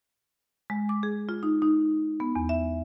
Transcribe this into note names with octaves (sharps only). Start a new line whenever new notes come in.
G#3
D6
G#4
F4
D#4
D#4
B3
E2
E5